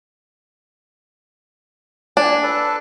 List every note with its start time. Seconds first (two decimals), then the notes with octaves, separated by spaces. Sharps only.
2.17 D4 G#5
2.43 A4 B4 A5